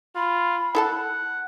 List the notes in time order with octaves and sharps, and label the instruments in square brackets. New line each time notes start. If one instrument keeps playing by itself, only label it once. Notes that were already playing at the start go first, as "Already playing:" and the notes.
[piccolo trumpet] F4 [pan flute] B5
[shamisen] E4 A4 A5 [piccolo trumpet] F#5